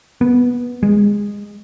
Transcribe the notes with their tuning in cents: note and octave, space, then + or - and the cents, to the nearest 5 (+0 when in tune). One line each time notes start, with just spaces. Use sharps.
B3 -10
G#3 -20